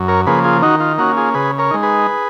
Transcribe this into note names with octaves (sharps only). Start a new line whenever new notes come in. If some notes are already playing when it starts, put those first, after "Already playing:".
Already playing: F#2
A#4 C#5
C#3 F3 A#3 G#4 B4
F4 G#4
D#3 D#4 F#4
F4
A#3 C#4 D#4 F#4
F4 G#4
C#3 G#4 B4
A#4 C#5
G#3 D#4
G#4 B4